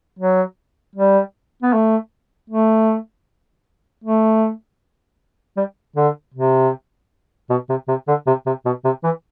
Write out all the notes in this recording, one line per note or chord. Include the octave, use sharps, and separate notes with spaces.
F#3
G3
B3
A3
A3
A3
G3
D3
C3
B2
C3
C3
D3
C3
C3
B2
C3
E3